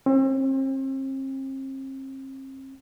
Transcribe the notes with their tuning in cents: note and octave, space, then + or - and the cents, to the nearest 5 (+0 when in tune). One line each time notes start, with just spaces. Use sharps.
C4 +40